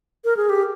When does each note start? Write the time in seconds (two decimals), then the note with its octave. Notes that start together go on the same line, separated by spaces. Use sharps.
0.25 A#4
0.37 G#4
0.49 G4